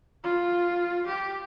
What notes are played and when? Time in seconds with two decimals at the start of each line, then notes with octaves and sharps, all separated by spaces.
0.24 F4
1.07 G4